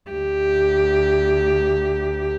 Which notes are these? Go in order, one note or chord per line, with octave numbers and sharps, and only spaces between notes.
D2 G4